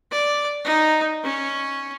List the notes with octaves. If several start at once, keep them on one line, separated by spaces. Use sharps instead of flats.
D5
D#4
C#4